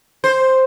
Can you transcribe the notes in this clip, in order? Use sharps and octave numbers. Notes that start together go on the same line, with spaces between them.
C5